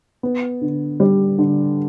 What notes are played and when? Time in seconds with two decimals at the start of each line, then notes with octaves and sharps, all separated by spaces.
0.23 B3
0.61 D3
1.00 G3
1.38 D3